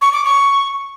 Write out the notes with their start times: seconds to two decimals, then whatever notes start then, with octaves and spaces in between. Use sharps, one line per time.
0.01 C#6
0.13 D6
0.24 C#6